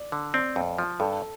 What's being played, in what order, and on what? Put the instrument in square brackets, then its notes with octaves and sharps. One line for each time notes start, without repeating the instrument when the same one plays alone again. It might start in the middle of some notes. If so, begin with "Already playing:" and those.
Already playing: [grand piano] D5
[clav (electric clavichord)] D3
[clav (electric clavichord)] C4 [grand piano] D5
[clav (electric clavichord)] F2
F3
[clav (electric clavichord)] G2 [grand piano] A4